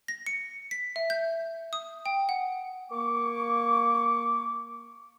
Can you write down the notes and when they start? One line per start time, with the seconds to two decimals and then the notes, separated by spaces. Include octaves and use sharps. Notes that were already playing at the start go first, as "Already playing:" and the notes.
0.08 A#6
0.27 C#7
0.71 B6
0.96 E5
1.10 G6
1.73 D#6
2.06 G5
2.29 F#5
2.92 A#3 C#6 D6